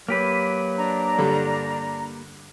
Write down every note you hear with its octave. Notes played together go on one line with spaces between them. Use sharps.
F#3 A#3 G4 B4
D4 A#5
G2 D3 G3